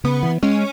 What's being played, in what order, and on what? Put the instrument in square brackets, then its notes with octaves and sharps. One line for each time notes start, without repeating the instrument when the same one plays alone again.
[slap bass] C#3 [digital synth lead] B3
[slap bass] E3
[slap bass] G#3 [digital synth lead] C#4